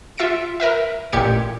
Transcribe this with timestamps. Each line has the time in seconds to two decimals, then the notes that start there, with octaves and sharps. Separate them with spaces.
0.17 F4 E5 A6 C#7 D7
0.60 A#4 B4 E5
1.12 A1 A#2 G4 G#6 C#7